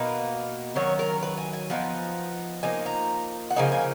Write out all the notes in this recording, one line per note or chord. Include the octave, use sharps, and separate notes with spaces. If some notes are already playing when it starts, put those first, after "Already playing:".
Already playing: B2 A#3 D#4 B4
D#3 F#3 C#4 C#5
A#4
B4
G#5
G#5
F3 B3 D#4
F3 A#3 D#4 G#5
A#5
F#5
C#3 F3 A#3 D#4 G#5
G#5